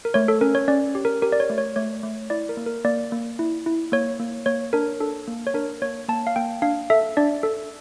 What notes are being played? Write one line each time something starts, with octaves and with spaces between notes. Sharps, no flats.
A#4
A3 C#5
A4
C#4 A#4
C#5
C#4 D5
G4
A#4
G4 A#4
D5
C#5
A3
C#5
A3 C#5
A3
E4 D5
A#4
A#3
A#4
A#3 D5
A#3
E4
E4
A#3 C#5
A#3
A#3 C#5
D4 A#4
D4 A4
A#3
C#5
D4 A#4
A#3 C#5
A#3 A5
F5
A#3 G5
D4 F5
A4 E5
D4 D5
A4